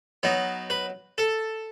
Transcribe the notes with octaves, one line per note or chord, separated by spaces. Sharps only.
F#3 B3 D#4
B4
A4